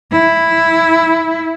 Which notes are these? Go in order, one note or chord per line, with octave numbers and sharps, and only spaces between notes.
E4